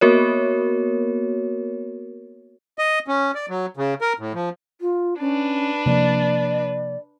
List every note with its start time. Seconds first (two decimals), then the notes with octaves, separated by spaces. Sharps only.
0.01 A#3 B3 F#4 A#4 C#5
2.78 D#5
3.08 C#4
3.35 D5
3.49 F#3
3.77 C#3
4.01 A#4
4.19 A2
4.34 F3
4.81 F4
5.20 C#4 D4 B4
5.86 C3 F3 A#3 D5